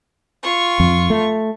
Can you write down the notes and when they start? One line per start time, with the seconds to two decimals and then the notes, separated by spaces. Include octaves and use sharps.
0.43 F4 C#6
0.80 F2
1.10 A3